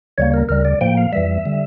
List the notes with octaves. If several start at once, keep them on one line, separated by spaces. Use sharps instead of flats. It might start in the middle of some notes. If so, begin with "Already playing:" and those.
D2 C#3 G3 A#3 C#5
A#4
D2 C#3 G3 A#4
D5
A2 F3 A#3 G5
F5
F2 E3 G3 E5
D3 G3